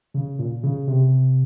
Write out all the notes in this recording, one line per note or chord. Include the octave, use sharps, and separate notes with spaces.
C#3
A#2
C#3
C3